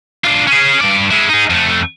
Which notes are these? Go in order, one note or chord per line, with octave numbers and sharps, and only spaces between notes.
D4 F4
C#4 G#4
G2 D5
G#3 E4
D#4 G#4
F2 A3